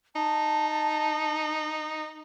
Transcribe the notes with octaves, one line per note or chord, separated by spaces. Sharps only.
D#4 A5